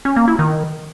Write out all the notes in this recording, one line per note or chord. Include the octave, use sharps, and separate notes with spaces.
C#4
A#3
E4
D#3